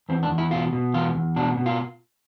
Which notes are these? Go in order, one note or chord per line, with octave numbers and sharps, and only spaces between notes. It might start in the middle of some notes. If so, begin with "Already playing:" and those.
E2 C4
D4
E2
E4
B2 F4
B2
E2 F4
E2
B2 D4
B2
F4